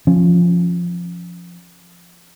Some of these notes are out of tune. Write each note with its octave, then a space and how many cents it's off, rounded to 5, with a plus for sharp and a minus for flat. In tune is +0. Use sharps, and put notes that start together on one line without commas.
F3 +0 C#4 -15